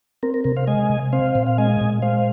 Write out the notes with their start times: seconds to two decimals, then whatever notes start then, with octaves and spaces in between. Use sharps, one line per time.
0.23 C4 A#4
0.34 A#4
0.44 C3 A#4
0.56 C5 F5
0.67 G#3 D#5 G#5
0.90 C3
1.13 C4 C5 F5
1.35 A#2
1.47 F5
1.58 G#3 D#5 G#5
1.81 A#2
2.02 G#3 C5 F5